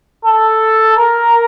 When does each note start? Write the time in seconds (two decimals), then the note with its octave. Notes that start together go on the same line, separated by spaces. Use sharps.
0.24 A4
0.98 A#4